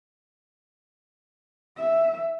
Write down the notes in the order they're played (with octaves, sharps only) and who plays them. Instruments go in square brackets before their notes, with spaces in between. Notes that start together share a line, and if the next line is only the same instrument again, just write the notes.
[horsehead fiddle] E5